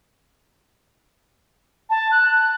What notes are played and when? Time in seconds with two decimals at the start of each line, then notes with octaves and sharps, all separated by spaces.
1.90 A5
2.12 F#6